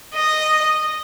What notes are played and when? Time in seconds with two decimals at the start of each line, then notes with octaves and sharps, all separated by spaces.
0.14 D#5